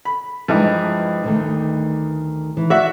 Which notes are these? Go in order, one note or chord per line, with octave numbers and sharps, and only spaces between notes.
B5
G2 E3 F3 G#3 D#4
D2 D#3 A3
E3
F#4 D5 E5 F#5